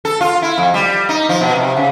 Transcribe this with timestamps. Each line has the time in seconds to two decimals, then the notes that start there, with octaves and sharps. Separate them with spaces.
0.05 A4
0.21 F4
0.42 E4
0.58 F2
0.74 G3
1.09 D#4
1.29 F3
1.41 B2
1.55 C3
1.76 C#3